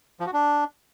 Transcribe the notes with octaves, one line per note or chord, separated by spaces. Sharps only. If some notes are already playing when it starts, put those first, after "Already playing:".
F3
F#4
D4